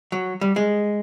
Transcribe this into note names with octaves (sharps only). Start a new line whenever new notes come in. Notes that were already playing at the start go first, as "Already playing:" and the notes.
F#3
G3
G#3